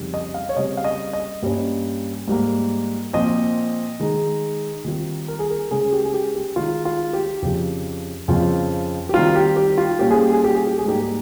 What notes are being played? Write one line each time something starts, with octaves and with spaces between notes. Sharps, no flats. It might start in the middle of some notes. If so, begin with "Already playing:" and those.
Already playing: F2 C#3 G3 C4 D#4
D#5
F5
C#5
C#3 G3 C4 D#5
F5
D#5
D#5
G2 G3 A#3 C#4
G#2 G3 A#3
A#2 F3 C4 F4 D#5
D#3 G#3 D#4
D#3 G3 C4 F4
A#4
G#4
A#4
C#3 G#3 C#4 G#4
G4
G#4
G4
G4
D#3 G#3 D#4 F4
F4
G4
F2 C#3 F3 G4
F2 C#3 F3 C4 F4
G4
D#3 G3 C4 D#4 F4
G4
G4
F4
A#2 G3 C#4 F4 G4
G#4
G4
G#4
G4
G#4
G4
G#4
G#2 G3 A#3 D#4 G4
G#4